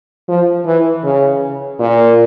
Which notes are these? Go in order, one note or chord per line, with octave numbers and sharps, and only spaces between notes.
F3
E3
C#3
A#2